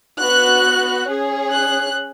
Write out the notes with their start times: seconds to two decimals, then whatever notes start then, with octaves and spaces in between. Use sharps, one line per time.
0.19 B3 F#4 F#6
1.07 C#4 G#4
1.51 F#6